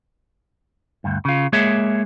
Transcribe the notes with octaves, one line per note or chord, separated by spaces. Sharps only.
D2 G2
C#3 F4
G#3 A#3 G#4 C#5 E5